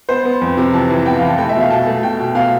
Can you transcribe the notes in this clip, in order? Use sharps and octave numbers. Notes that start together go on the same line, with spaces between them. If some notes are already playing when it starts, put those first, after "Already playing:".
B3 C5
B3
F2
C3
E3 A5
E3
B3 G5
F5
E3
A5
A3 G5
E5
B2
F5
B2 A5
A3
B2 G5
B2
B2 F5